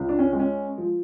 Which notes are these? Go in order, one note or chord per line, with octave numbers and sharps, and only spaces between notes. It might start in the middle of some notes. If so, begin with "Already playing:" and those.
Already playing: C#2
D4
C#4
G#3
C#4
F3